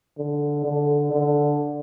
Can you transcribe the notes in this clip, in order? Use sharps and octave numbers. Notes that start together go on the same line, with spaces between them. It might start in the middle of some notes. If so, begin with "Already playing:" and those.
D3
D3
D3